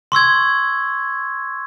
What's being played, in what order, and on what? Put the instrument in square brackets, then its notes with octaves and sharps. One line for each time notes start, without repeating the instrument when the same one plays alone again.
[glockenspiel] C6 C#6 E6 G#6